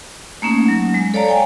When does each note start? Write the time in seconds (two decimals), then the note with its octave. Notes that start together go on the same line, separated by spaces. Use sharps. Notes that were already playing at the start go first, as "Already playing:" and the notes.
0.42 A3 A#3 C#4 D#4
0.68 F#3
0.94 G#3
1.14 A4 C#5 D5 F5 A5 A#5
1.29 F5 G5 G#5